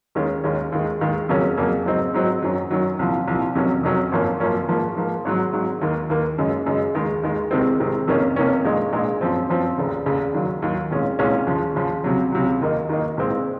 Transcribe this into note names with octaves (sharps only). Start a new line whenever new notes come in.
D#2 D#3 G#3 C#4
D#2 D#3 G#3 C#4
D#2 D#3 G#3
D#2 D#3 G#3
F2 C#3 F#3 A#3 C#4
F2 C#3 F#3 A#3 C#4
G#2 F#3 C4 D#4
G#2 F#3 C4 D#4
F#2 D#3 F#3
F#2 D#3 F#3
C2 A#2 F3
C2 A#2 F3
F2 C3 D#3 F#3 C#4
F2 C3 D#3 F#3 C#4
G#1 F#2 F3 A#3 C#4
G#1 F#2 F3 A#3 C#4
G#2 F3 A#3
G#2 F3 A#3
G#1 G#2 F#3
G#1 G#2 F#3
D#2 D#3 A#3
D#2 D#3 A#3
F#2 C#3 G#3 D#4
F#2 C#3 G#3 D#4
D#2 D#3 G#3
D#2 D#3 G#3
C2 C3 D#3 G#3 C4
C2 C3 D#3 G#3 C4
F2 C3 D#3 A#3 C#4
F2 C3 D#3 A#3 C#4
A#1 A#2 G#3 D#4
A#1 A#2 G#3 D#4
F#2 F3 C4
F#2 F3 C4
F1 D#2 C#3
F1 D#2 C#3
D#2 D#3 F#3
D#2 D#3 F#3
C2 A#2 G#3 C#4
C2 A#2 G#3 C#4
D#2 C#3 F3
D#2 C#3 F3
C#2 C3 F#3
C#2 C3 F#3
D#2 D#3 A#3 D#4
D#2 D#3 A#3 D#4
C2 A#2 G#3 C4